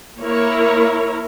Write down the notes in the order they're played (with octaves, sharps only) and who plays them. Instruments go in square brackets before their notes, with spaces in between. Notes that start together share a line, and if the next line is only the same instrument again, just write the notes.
[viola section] A#3 E4 A#4 C#5